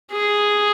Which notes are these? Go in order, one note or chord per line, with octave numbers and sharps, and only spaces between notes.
G#4